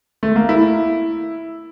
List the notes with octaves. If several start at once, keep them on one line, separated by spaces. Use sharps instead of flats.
A3
A#3
E4